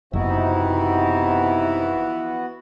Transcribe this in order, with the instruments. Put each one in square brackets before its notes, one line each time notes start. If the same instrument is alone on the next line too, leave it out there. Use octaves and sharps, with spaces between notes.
[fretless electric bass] F#1 [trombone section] C3 D#4 [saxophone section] E3 F3 E4 [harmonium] B3 F#4